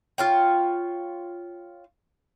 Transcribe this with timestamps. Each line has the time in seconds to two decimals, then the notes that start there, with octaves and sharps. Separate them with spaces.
0.18 F4 C#5 G5